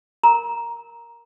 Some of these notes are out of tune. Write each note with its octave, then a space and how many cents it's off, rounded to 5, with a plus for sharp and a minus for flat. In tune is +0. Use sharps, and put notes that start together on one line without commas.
A#4 +0 A#5 +5